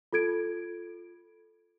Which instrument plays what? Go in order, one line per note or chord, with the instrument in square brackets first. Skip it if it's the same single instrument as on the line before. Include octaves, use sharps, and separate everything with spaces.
[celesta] F4 A4 G#6 D7